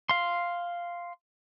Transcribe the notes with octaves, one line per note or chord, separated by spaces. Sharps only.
F5 C6